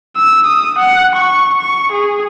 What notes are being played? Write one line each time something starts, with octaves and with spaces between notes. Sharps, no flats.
E6
D#6
F#5
C#6
C#6
G#4